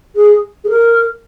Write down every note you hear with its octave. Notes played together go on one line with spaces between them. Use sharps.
G#4
G#4
A#4